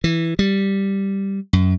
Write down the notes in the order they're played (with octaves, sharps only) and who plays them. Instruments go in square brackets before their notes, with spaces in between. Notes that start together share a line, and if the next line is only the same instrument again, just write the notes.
[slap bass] E3
G3
F#2